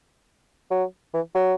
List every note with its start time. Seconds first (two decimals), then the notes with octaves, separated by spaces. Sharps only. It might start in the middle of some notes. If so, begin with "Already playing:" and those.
0.71 F#3
1.14 E3
1.35 F#3